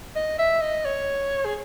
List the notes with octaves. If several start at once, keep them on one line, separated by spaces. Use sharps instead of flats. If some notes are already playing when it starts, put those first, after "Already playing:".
D#5
E5
D#5
C#5
G#4